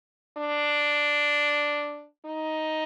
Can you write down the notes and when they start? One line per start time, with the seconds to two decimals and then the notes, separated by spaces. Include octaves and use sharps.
0.38 D4
2.26 D#4